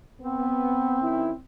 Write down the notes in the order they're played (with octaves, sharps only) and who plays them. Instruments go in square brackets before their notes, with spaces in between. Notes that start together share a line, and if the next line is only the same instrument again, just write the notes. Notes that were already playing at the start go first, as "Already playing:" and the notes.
[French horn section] B3 [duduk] C4
[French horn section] D#3 C#4 E4